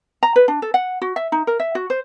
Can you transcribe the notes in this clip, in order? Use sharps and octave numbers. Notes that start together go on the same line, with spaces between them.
A#5
B4
D4
A4
F#5
F#4
E5
D#4
A#4
E5
F#4
C5